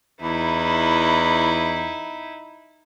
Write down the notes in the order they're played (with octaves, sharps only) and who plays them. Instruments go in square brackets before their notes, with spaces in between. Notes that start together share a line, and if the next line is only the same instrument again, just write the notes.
[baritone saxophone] E2 [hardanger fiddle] D#4 E4